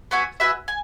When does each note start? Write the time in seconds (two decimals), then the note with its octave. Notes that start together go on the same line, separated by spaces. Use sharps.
0.11 B3 F#4 E5 G#5
0.40 F#4 B4 E5 G#5
0.68 G#5